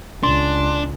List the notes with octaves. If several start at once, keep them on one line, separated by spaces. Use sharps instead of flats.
C#2 D4 C6